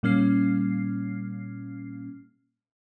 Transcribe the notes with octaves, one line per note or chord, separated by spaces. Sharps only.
A#2 G3 A#3 C#4 F6 C7